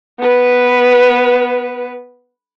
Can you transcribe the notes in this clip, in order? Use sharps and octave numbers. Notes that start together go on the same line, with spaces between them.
B3 B4